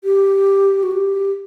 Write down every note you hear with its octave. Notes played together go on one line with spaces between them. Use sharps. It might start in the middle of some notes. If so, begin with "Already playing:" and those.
G4
F#4
G4